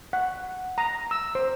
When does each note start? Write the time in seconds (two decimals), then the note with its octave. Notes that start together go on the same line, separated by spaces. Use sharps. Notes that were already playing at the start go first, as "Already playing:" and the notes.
0.13 F#5
0.78 A#5
1.11 E6
1.35 C5